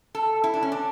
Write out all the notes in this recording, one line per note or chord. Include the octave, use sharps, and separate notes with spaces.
A4
E4
D4
C#4
D4